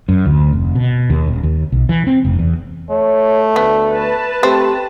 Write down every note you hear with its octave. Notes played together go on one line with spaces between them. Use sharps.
F#2
D2
F1
B2
D#2
D#1
D#2
B1
E3
C4
F1
E2
A3 C#5
D2 B3
B4 A5
A3 C4 G4